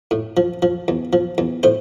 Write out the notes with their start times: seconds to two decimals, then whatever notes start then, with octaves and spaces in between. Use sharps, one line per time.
0.11 A2
0.37 F3
0.62 F3
0.88 E2
1.13 F3
1.38 E2
1.63 A2 C5